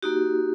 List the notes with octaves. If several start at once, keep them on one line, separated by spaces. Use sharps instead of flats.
A#3 D#4 F#4 G4